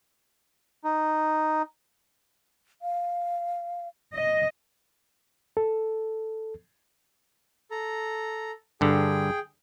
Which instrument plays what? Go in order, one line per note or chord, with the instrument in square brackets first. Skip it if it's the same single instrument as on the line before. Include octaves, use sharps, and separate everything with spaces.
[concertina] D#4
[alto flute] F5
[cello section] D#5
[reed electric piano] A4
[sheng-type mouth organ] A4 A#5
[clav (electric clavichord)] G2 D3 [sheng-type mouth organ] G#4 G5